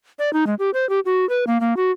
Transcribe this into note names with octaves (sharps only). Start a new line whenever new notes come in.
D5
D#4
G#3
G4
C5
G4
F#4
B4
A#3
A#3
F#4